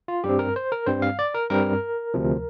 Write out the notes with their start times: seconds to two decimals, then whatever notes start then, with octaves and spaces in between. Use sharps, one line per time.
0.08 F4
0.24 G2 G3 C4 G4
0.39 A#4
0.56 C5
0.72 A#4
0.86 G2 G3 C4 C5
1.02 F5
1.19 D5
1.35 A#4
1.50 G2 G3 C4 A#4
2.14 D2 C3 F3